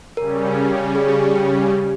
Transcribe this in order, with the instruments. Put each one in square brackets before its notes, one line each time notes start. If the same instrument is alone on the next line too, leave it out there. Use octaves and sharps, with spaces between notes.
[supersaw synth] C#3 G3 C#4 [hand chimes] A#4
[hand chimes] G#4
G4
G4